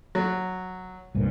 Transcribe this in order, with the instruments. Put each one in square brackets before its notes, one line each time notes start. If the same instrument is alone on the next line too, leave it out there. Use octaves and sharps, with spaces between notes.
[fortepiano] F#3
[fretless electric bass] C2 G2 A#2